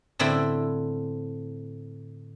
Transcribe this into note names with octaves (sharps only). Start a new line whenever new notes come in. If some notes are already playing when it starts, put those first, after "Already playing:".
A2 D3 C4 E4